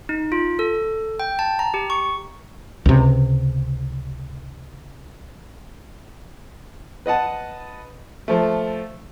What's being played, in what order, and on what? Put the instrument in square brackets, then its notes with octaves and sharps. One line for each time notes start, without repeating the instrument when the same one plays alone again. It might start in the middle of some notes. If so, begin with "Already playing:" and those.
[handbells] D#4
F4
A4
G5
A5
A#5
G4
C#6
[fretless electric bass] C#2 C3
[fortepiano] B4 D#5 F#5 A5
F3 A3